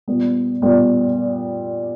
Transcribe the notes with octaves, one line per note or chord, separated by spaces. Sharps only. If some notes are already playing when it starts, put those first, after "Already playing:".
A#2 G3 B3
A#2 G3 B3